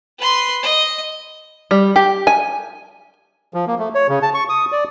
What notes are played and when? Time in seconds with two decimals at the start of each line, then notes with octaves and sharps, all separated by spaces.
0.19 B4 C6
0.63 D#5
1.71 G3
1.96 G4
2.27 G#5
3.54 F3
3.67 A#3
3.79 A3
3.95 C#5
4.09 C#3
4.22 A5
4.34 C#6
4.49 D#6
4.72 D5